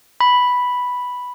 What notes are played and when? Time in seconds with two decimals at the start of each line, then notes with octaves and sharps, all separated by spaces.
0.21 B5